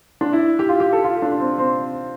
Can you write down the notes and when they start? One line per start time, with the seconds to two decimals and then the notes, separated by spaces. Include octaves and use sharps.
0.21 D4
0.33 E4
0.59 G4
0.69 F4
0.80 G4
0.93 A4
1.04 F4
1.22 D4
1.40 C4
1.58 C4